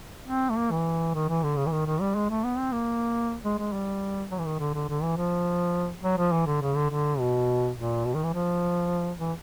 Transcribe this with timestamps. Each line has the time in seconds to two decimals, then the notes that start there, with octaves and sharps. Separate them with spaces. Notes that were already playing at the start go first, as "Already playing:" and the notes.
0.28 C4
0.50 A3
0.57 A#3
0.71 E3
1.14 D#3
1.29 E3
1.43 D3
1.57 C#3
1.67 E3
1.72 D#3
1.86 D#3
2.00 G3
2.15 G#3
2.30 A3
2.44 B3
2.58 C4
2.72 A#3
3.44 G#3
3.59 G#3
3.73 G3
4.31 F#3
4.39 E3
4.45 D#3
4.59 D3
4.74 D3
4.89 D3
5.03 E3
5.17 F3
6.03 F#3
6.18 F3
6.32 E3
6.47 D3
6.61 C#3
6.76 D3
6.90 D3
7.19 B2
7.76 A#2
8.05 B2
8.15 D#3
8.24 E3
8.33 F3
9.20 E3